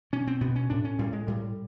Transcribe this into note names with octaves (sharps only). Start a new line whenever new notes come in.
B2 C#4
C4
B2 B3
C#4
A2 D4
C#4
A2 G3
G#3
A2 G3